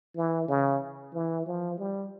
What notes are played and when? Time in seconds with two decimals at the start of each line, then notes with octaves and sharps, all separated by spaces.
0.16 E3
0.48 C#3
1.14 E3
1.46 F3
1.78 G3